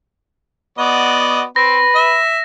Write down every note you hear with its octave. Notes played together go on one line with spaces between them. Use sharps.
B3 F#4 D5 D#5
C4 B4 A#6
E5